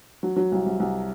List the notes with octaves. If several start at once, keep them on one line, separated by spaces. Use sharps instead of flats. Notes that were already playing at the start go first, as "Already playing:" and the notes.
F#3
F#3
C2
C2
C2